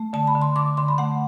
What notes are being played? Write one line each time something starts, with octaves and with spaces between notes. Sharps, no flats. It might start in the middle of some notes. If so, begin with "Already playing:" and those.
Already playing: A3
D3 A5
B5
D3
C6
D3 D6
D3 C6
B5
A3 F#5